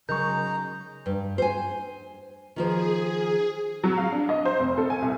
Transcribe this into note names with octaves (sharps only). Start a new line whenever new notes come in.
C#3 F#3 G#3 D#4 A#4 A#5 C#6 G6
G2
C5 G#5
D#3 F3 G#4 C5
F#3
F5
D4
D#5
C5
F1
A4
G#5
C2